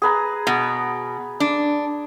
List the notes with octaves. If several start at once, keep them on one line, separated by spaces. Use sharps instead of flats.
G#4 B4 A#5
B2
D4